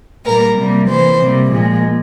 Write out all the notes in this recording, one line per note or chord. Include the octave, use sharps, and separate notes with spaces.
A#2 G3 A#3 A#4
C3 G3 A#3
E3 A#3 C5
C3 G3 A#3
A#2 F3 G#3